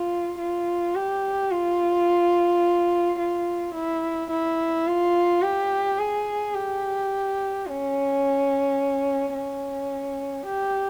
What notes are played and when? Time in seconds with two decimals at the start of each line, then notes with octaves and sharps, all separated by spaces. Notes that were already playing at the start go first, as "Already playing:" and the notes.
Already playing: F4
0.39 F4
0.95 G4
1.51 F4
3.19 F4
3.75 E4
4.31 E4
4.87 F4
5.42 G4
5.99 G#4
6.54 G4
7.66 C#4
9.34 C#4
10.46 G4